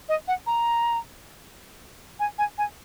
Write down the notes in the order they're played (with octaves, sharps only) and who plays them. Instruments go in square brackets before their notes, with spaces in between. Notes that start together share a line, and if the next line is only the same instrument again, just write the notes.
[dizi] D#5
F#5
A#5
G#5
G#5
G#5